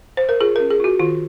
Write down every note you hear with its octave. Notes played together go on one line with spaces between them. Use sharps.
C5
A#4
F4 G#4
C#4 A#4
G#4
F4 F#4
D#3 F4